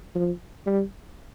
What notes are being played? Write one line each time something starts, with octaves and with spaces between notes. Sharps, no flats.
F3
G3